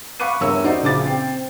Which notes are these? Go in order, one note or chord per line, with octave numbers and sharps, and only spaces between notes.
F5 B5 C#6 D6 F#6 D#7
E2 G2 A#4 C#5 E5 E6
D#4 F#4 C5 D5
A#1 C#3 D6 A6
C4 C5 G5